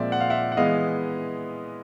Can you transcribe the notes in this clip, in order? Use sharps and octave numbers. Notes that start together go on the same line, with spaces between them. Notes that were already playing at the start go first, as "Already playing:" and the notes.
Already playing: A#2 F3 G#3 C4 D5 E5
F#5
F5
E5 F#5
F#5
E3 G#3 B3 D#5 F5